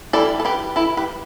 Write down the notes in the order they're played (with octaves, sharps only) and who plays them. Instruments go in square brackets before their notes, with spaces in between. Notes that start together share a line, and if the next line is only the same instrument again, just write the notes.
[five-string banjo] E3 G3 E4 A4 D5
A4
G4 B4
E4 A4
G4 B4